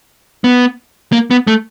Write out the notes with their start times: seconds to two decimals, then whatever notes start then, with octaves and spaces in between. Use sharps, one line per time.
0.44 B3
1.13 A#3
1.31 B3
1.47 A3